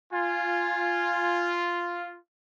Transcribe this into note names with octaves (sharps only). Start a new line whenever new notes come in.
F4 G#5